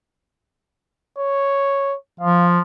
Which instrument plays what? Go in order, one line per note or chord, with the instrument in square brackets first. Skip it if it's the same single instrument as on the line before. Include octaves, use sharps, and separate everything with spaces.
[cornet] C#5
[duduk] F3 [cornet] F5